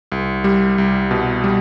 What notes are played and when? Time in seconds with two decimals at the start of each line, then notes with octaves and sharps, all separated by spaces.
0.12 C2
0.44 G3
0.78 C2
1.11 B2
1.44 G3